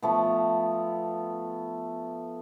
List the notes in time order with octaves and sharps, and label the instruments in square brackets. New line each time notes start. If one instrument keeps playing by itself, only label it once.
[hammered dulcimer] F3 A3 B3